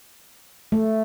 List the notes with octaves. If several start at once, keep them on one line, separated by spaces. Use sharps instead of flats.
A3